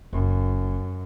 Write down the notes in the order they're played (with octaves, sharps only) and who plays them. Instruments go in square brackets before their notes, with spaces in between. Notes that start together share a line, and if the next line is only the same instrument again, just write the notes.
[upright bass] F#1 [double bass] F#2